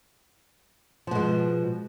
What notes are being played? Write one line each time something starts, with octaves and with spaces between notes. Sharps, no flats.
B2 F3 G#3